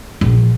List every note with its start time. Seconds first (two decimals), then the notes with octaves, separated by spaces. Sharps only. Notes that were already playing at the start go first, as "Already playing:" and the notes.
0.21 A#1